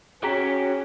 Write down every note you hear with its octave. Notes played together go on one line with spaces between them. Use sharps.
C#4 F#4 G#4 G5 A#5 B6